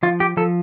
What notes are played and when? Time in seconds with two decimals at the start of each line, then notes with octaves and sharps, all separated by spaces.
0.03 F3 F4
0.20 G4
0.37 F3 A4